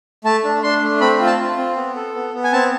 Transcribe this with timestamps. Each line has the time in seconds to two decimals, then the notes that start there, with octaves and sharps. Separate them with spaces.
0.25 A3 A5
0.44 D4
0.63 D4 C6
0.82 A3
1.01 C4 B5
1.20 F4
1.26 A5
1.39 F4
1.58 C4
1.77 B3
1.96 A4
2.15 B3
2.33 B3
2.44 G#5
2.53 C4 A5